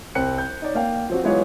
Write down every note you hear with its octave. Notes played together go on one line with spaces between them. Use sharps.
C2 C4 G5 F#6 C#7
G6
D#4 C#5 D5
A#3 F5 G5
F3 C4 F#4
E3 F#3 G#3 B3 F4 C#5